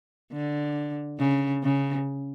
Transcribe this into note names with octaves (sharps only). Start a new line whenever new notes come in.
D3
C#3
C#3